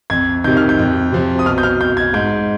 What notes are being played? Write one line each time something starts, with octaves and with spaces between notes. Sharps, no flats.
F2 G#6
C3 D#3 G6
F6
G6
F2
C3 F3
D#6
B2 F6
G6
F6
G6
G#6
G#2 G6